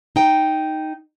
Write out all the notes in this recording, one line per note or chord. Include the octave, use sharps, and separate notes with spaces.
D#4 G5